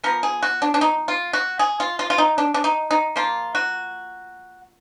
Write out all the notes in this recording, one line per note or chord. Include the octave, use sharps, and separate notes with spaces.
F3 B3 A#4
G#4
F#4
D4
D4
D#4
F4
F#4
G#4
F4
F4
F4
D#4
D4
D4
D#4
D#4
F3 A#3 F4
F#4